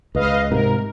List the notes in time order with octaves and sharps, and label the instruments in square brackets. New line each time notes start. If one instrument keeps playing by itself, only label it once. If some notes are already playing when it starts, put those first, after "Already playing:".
[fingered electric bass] C#2 [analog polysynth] B4 D#5 F5
[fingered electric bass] G#2 C3 [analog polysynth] A#4